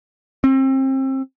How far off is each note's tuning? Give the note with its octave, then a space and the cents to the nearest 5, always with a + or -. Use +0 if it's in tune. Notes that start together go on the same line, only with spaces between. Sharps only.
C4 +30